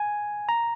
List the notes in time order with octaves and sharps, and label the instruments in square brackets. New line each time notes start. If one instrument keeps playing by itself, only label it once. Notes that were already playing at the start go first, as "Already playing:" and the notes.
Already playing: [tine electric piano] G#5
A#5